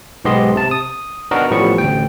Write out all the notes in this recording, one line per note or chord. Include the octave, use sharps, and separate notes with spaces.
B1 G#2 B3 G4 D#5 C6
C3 A5
D#6
B3 D4 D#4 F#4 A#4
A1 A2 F3 G3 B3 C#6
A1 D2 G5